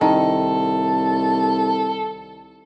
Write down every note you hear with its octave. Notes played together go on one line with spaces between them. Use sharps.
C2 D#3 A4